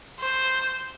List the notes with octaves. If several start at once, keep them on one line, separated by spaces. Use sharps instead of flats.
C5